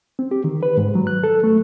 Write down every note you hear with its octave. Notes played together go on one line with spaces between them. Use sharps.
C4
G4
D#3
B4
G#2
F#3
F#6
A4
A3